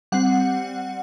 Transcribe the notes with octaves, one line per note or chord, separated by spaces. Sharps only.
G3 C4 F#5